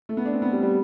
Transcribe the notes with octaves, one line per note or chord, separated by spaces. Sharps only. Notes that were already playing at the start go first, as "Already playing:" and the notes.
A3
B3
D4
C4
B3
G3
G3